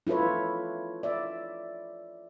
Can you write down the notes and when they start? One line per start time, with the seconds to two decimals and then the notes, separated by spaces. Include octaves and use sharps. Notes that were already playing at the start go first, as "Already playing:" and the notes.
0.07 E4 F4 A4 B4 C#5
1.03 D5 E5